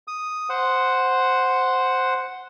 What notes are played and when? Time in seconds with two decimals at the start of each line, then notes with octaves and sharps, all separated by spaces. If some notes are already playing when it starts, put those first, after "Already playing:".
0.08 D#6
0.50 C5 F#5